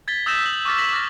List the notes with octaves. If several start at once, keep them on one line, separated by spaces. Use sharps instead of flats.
G#6 A6 B6 G7
D#6 E6 G6 A#6 B6 E7
F#7
C#6 D6 F6 A6 B6
A#6 B6 F#7
D6 F6 A6 A#6